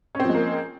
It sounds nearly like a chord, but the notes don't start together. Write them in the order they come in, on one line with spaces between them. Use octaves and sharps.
C#4 C4 F3 G#3 A#3